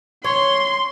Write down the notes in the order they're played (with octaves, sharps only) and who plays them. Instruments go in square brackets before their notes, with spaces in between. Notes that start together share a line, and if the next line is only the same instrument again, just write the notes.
[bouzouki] C#5 [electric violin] C6